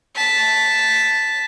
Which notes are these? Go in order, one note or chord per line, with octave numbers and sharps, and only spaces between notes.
A5 B6